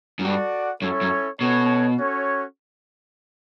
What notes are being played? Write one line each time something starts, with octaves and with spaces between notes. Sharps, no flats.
F#2
G2 F#4 A4 D5 F#5
F#2 C#4 E4 A4 C#5
F#2
B2 C#4 F#4 A4 C#5
C#4 F#4 A4 C#5